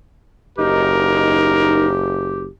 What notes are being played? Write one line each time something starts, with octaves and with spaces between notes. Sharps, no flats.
F#1 D#4 G4 A#4